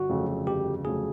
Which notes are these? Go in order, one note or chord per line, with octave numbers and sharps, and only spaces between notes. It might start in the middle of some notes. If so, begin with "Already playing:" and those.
Already playing: G1 F#4
F2 C#3 F#3 A3
G1 G4
F2 C#3 F#3 A3 G#4